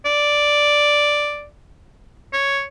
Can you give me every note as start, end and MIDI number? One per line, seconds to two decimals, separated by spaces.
0.05 1.47 74
2.33 2.63 73